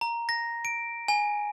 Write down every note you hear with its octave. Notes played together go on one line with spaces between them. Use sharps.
A#5
A#6
D7
G#5